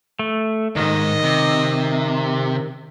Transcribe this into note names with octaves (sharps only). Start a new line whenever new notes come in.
A3
C#2 G#2 D#3 D#5
C3